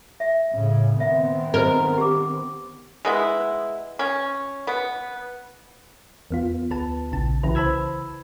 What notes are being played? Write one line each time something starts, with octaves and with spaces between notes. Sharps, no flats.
E5
A2 C#3
D#3 B3 C4 E5
A#4 C5 D#5
G4 D6
G#3 B3 E4
C#4
B3
E2 B3 F4
D2 B4 A5
A#1 C#3 A5
C2 C#3 E3 E4 B4
C5 A5 B5 E6 G#6